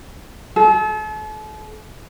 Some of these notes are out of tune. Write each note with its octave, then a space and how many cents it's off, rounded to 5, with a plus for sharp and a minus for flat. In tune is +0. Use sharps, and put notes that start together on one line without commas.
A4 -40